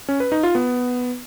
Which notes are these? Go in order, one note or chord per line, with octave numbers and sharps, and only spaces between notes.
C#4
B4
D#4
F4
B3